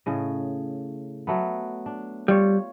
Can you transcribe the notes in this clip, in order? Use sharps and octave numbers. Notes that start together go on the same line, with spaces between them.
A2 C#3 D#5
F#3 A3 B3
D4
G3 F4 C#5